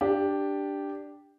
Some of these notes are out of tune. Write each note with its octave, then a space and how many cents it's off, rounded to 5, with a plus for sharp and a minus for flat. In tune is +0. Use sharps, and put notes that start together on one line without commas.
D4 +0 G4 +0